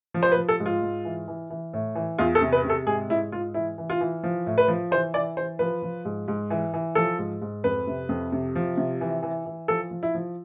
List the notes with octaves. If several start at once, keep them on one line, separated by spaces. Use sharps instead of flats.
F3
C5
B4
F3
A4
G#2
F4
G#2
E3
E3
E3
A2
E3
E2 F4
A4
C3
B4
C3
A4
G#2 G#4
G#2 E4
G#2 F4
E3 E4
E3
F4
E3
F3
A2
B4
F3
E3 C5
E3 D5
E3 C5
F3 B4
F3
G#2
G#2
E3
E3
F3 A4
G#2
G#2
F2 B4
C3
F2
C3
F3
C3
E3
E3
E3
F3 A4
F3
E4
F3